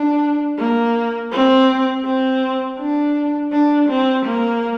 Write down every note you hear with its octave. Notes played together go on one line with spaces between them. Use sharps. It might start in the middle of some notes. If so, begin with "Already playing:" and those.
Already playing: D4
A#3
C4
C4
D4
D4
C4
A#3